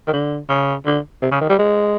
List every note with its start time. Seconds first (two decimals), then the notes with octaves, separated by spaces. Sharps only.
0.07 D#3
0.13 D3
0.49 C#3
0.86 D3
1.22 C3
1.31 C#3
1.41 D#3
1.49 G3
1.59 G#3